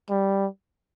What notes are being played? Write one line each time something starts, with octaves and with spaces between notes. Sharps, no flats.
G3